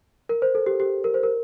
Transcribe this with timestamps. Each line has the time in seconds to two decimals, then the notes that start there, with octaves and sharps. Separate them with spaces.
0.29 A#4
0.42 C5
0.55 A4
0.66 G4
0.80 G4
1.04 A#4
1.14 C5
1.23 A#4